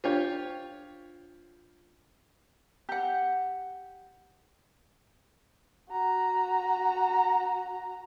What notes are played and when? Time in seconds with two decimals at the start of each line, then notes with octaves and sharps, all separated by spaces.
0.04 D4 F4 G4 C5 C#5
2.89 G4 F#5
5.90 F#4 A#5